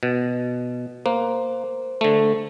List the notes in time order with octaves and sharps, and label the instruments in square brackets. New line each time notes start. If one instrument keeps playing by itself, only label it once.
[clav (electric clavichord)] B2
[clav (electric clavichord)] A#3 [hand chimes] C5
[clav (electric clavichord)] D3 A3